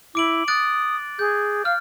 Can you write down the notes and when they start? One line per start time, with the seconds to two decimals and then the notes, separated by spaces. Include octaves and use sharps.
0.15 E4 D6 D7 F#7
0.48 D#6 F#6 A6 D7
1.19 G#4 G6
1.65 F5 F6